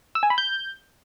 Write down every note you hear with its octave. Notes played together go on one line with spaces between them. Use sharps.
E6
G#5
B5
G6